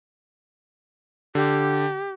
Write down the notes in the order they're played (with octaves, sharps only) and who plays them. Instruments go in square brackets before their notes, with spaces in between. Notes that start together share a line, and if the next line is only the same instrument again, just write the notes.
[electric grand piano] D3 [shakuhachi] G4